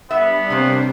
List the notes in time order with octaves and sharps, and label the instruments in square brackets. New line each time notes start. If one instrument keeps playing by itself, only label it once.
[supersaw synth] G3 D4 [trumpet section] B3 [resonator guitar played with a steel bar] E5
[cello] C3 C5 [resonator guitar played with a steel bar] A#3 C#4